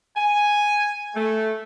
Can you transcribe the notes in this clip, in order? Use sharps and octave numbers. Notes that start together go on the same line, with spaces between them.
G#5
A3